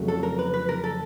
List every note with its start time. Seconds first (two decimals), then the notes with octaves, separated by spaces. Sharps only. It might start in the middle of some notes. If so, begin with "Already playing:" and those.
Already playing: F2 C#3 F#3 A3
0.08 A4
0.23 A#4
0.39 B4
0.54 B4
0.69 A#4
0.84 A4